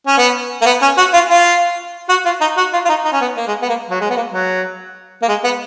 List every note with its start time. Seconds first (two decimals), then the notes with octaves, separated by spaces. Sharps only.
0.07 C#4
0.18 B3
0.62 A#3
0.66 B3
0.82 C#4
0.98 F#4
1.14 F4
1.30 F4
2.09 F#4
2.25 F4
2.41 D#4
2.57 F#4
2.73 F4
2.85 F4
2.89 D#4
3.05 D#4
3.13 C#4
3.21 B3
3.37 A#3
3.48 G#3
3.62 B3
3.69 A#3
3.90 F#3
4.01 G#3
4.10 B3
4.16 A#3
4.33 F#3
5.22 A#3
5.28 G#3
5.44 B3